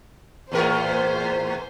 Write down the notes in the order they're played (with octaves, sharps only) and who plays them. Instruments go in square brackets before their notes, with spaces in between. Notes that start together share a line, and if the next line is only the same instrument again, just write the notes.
[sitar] E2 A2 A#4 [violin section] C5